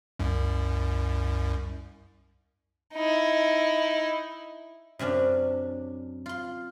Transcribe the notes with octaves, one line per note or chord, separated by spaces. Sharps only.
C2 F#2
D#4 E4
F#2 C3 C#4 D4
F4 C6